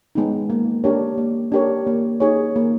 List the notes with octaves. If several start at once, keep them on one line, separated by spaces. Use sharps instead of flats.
G#3 B3 D#4
A#3
D4 G4 A#4 C#5
A#3
D4 G4 A#4 C#5
A#3
D#4 G#4 C#5
A#3